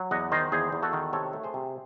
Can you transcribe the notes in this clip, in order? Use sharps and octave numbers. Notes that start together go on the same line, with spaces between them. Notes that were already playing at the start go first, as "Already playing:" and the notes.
Already playing: F#3
E2 D#5 F#5
D#3 C5 D#5
E2 G#4 C5
E2
F#4 A4
D#3
C3 A4 C#5
A3
G#4 C5
C3